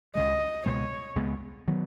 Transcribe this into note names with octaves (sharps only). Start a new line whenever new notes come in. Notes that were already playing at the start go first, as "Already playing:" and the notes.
C#2 C#3 G#3 D#5
C#2 B2 G#3 B3 C#5
C#2 C#3 G#3 B3
D#3 F#3 B3